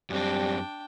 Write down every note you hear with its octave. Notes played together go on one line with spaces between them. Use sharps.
F#2 G3 C4 D4 G5